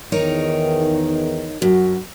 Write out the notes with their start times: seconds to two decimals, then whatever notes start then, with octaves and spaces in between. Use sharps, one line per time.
0.12 E2 D#3 D#4 A#4 C#5
1.62 F#2 F#4